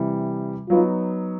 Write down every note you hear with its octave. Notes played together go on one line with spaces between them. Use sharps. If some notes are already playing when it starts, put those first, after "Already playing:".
Already playing: C3 E3 G3
F#3 B3 D#4 F4